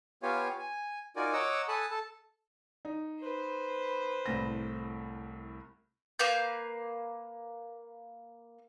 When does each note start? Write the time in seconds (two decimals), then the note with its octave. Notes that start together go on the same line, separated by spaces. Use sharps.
0.23 B3 F4 G4 C#5 F5 G#5
0.59 G#5
1.16 D#4 F4 F#4 A#4 D5 G#5
1.33 C#5 D#5 F#5 A#5 D6 E6
1.68 A4 G#5 A5 B5 D#6 F#6
1.91 A4 A5
2.85 D#4
3.20 B4 C5
4.26 C2 A2 A#6
6.19 A#3 B4 F5 G6